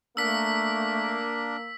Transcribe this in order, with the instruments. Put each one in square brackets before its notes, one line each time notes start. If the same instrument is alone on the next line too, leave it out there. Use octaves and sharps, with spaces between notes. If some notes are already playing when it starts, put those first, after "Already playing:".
[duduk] A3 [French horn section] A#3 [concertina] D4 A#4 [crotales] E6 B6